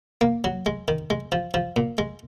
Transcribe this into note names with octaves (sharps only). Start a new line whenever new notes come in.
A#3
F#3
G#3
D#3
G#3
F3
F3
A#2
G#3